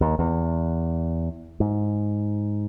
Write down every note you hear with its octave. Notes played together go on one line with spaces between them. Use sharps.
D#2
E2
G#2